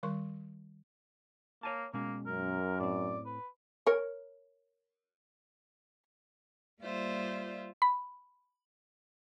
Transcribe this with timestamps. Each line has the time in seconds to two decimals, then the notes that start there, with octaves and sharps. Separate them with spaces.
0.03 D#3 G3 A#4 C6 C#6
1.63 A#3 C#5 G#5 A5
1.94 B2 G#3 A#3 C#4
2.27 F#2 A#4
2.80 A2 C4 D5
3.25 B4
3.87 A#4 C#5
6.81 G3 A#3 F4 C5 D5 E5
7.82 B5